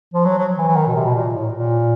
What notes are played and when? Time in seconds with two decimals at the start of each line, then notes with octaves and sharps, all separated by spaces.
0.14 F3
0.26 F#3
0.39 F#3
0.58 E3
0.68 E3
0.77 D#3
0.87 B2
0.96 C3
1.05 B2
1.15 A#2
1.35 A2
1.54 A#2